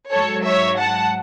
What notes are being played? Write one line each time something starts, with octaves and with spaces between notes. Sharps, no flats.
G#2 F#3 A4 C#5
C#5 E5
F#5 A5